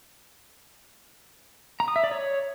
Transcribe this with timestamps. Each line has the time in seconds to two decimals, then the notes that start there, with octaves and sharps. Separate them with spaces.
1.80 A#5
1.88 D#6
1.96 E5
2.04 D5
2.11 C#5